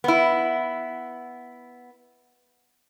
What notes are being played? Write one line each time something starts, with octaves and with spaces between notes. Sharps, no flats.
B3 E4